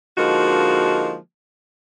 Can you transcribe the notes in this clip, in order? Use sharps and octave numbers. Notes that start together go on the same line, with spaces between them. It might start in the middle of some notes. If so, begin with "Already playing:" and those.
D3 F3 G#3 A#3 D#4 F#4